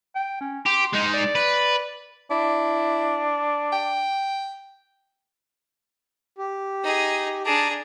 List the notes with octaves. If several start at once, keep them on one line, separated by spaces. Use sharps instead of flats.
G5
C#4
G4 C6
G#3 D#4
D5
B4
D4 E4
G5
G4
D#4 G#4
D4 G#4 A5 A#5 D6